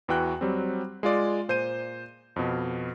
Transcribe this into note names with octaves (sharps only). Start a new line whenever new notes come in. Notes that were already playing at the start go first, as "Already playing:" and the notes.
E2 E3 F#4 G5 F#6
F#3 G3 C4
G#3 F4 D5
A#2 C5 G6 D#7
F2 B2